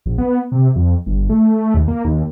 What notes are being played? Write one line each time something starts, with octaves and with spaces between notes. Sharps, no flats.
A#1
B3
C3
F2
G1
A3
D#2
A#3
D#2